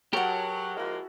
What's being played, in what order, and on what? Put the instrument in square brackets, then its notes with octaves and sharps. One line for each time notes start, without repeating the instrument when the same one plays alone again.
[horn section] F#3 [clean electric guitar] G4 [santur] G#4 B4 A5 [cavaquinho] A#4 F#5
[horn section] F3 G#3 A#3 [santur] E4 F#4